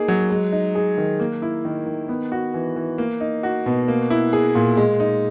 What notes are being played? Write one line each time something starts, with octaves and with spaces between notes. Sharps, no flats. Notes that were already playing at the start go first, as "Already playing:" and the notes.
Already playing: A#3 D#4 G#4
F#3
G#3
D#4
G#4
D#3
A#3
E4
D#3
D#3
B3
F#4
E3
E3
A#3
D#4
F#4
B2
A#3
E4
G#4
A#2
G#3
D#4